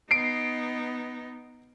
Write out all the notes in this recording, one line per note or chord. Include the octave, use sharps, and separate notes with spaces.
B3 D#4 C7 D7